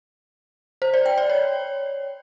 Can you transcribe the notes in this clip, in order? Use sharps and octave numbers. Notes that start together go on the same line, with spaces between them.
C5
D5
G5
D5
C#5